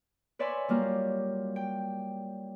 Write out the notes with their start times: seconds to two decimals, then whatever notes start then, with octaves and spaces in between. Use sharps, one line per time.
0.39 B4 C#5 D5 E5 G#5 C6
0.68 F#3 G3 A#3 F4
1.56 G5